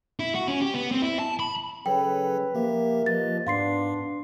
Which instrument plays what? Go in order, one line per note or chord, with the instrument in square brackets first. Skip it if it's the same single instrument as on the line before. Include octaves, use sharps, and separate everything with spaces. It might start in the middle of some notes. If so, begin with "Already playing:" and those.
[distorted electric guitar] E4
F#4
C#4
G4
B3
C4
E4
A5
B5
[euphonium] C#3 [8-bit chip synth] F#3 A4 C#5 [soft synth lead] B4 [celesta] G5
[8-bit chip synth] F3 G4 E5 [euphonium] A#3
[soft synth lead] F3 [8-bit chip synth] G4 B4 D#5 [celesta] A6
[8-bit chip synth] G#2 [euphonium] B3 [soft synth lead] D4 [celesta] F5 C6 C7